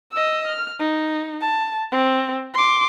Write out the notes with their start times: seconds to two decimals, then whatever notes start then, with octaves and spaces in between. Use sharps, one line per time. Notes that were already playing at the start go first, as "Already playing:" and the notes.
0.12 D#5 E6
0.47 F6
0.79 D#4
1.41 A5
1.92 C4
2.54 C6 D6